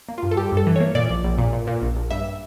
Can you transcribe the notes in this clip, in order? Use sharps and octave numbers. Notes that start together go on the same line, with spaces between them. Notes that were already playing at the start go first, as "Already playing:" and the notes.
A#3
G2 F4
A4
G3 G4
G2 A4
E3
A#3 C#5
A#2 D5
A#1
A#1
A#2
A#2
A#2
A#1
A#1
G2 E5